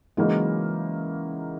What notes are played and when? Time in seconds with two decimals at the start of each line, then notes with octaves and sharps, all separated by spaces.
0.17 C#3 E3 F#3 G#3 A#3 D#4